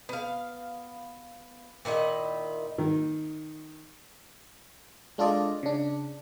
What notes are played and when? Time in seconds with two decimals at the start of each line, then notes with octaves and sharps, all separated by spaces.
0.09 B3 F5
1.85 A#2 D#3 E4 D#5
2.78 D#3
5.18 G#3 D4 F4 A4 D5 D#5
5.63 C#3 D4